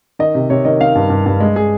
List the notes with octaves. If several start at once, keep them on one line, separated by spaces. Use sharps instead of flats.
D#3 D#5
C3
C3 C#5
D#3 D#5
D#3 F5
G2
G2
G2
G#3
G#3 G#4